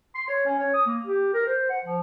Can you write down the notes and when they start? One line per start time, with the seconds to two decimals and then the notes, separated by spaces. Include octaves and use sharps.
0.15 C6
0.28 C#5
0.46 C#4
0.59 C#5
0.74 D#6
0.86 A#3
1.06 G4
1.34 A#4
1.46 C5
1.70 F#5
1.85 F3